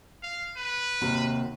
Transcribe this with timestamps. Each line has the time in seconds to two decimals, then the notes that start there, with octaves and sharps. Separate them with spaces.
0.23 F5
0.57 B4
1.01 D#2 C3 F#4